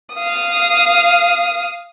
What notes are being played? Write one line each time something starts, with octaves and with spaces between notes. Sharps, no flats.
F5 D#6